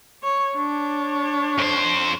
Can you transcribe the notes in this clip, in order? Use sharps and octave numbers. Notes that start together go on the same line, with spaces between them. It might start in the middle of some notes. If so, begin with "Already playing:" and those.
C#5
D4 C#5
F2 C5